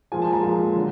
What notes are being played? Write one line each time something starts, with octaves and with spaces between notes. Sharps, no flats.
A#2 F3 G#3 G#5
A5
A#5
A#2 F3 G#3
D3 F#3